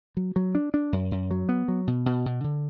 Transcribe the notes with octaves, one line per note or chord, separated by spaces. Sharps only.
F#3
F#3
D4
D4
F#2
F#2
F#3
B3
F#3
B2
B2
B2
D3